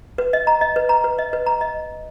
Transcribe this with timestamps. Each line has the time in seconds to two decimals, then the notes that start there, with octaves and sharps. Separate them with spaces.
0.18 B4
0.33 D#5
0.47 A#5
0.61 D#5
0.76 B4
0.89 A#5
1.04 B4
1.19 D#5
1.33 B4
1.46 A#5
1.61 D#5